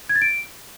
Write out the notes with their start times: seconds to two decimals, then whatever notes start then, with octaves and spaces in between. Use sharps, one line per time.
0.09 G#6
0.16 A6
0.22 D7